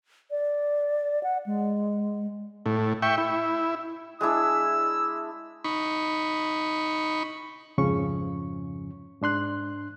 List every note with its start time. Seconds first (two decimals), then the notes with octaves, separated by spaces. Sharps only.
0.31 D5
1.23 F#5
1.46 G#3
2.66 A2
3.02 E5 G5 C#6
3.18 E4
4.21 G#3 D4 E4 E6
5.64 D#4 B5 C#6
7.78 F2 G#2 C#3 F3 C#4 C#6
9.22 G#2 D4 C6 F#6